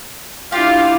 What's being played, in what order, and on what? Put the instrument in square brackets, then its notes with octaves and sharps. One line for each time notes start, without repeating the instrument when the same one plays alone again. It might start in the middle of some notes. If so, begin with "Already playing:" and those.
[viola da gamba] D4 E4 [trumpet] F4 [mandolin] G4 [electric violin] F5